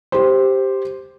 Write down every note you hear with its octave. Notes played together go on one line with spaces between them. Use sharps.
G4 C5